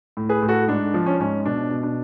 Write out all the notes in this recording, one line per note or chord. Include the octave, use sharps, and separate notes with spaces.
A2
G#4 B4
A2
F#4 A4
G#2 D4
F3
C#4
G#2 C#4
B2 D4
B2
D4